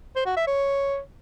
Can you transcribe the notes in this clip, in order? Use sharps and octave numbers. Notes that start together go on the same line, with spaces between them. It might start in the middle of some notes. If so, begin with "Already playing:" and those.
C5
F#4
E5
C#5